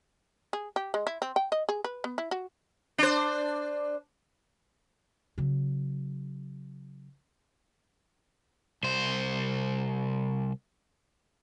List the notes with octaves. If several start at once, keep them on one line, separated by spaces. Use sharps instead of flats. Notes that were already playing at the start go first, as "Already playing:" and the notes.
G#4
G4
G#3
E4
C4
G5
D#5
G#4
B4
B3
E4
F#4
D4 C5
C#3 F#3
C2 C5